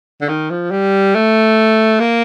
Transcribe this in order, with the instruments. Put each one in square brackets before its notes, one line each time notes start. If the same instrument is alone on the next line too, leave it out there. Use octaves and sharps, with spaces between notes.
[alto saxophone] D3
D#3
F3
G3
A3
A#3